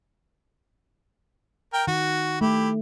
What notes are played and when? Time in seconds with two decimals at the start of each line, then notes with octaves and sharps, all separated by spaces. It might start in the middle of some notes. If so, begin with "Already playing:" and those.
1.73 A#4 G5
1.87 D#3 F#4
2.41 A3 E4 G4